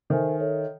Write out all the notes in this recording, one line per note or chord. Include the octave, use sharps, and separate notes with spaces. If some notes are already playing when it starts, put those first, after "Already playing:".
D#3 A4 C5 E5 G#5
A4 C#5 E5